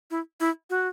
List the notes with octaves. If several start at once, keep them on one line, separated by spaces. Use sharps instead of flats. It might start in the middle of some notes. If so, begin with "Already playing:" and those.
E4
E4
F#4